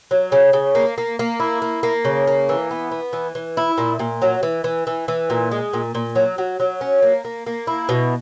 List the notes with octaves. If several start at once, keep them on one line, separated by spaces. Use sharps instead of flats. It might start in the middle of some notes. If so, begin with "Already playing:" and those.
F#3
C#3
C#3
A#3
A#3
A#3
E4
A#3
A#3
C#3
A#3
E3
B3
B3
E3
E3
E4
A#2
A#2
F#3
E3
E3
E3
E3
A#2
G#3
A#2
A#2
F#3
F#3
F#3
C#4
A#3
A#3
A#3
E4
B2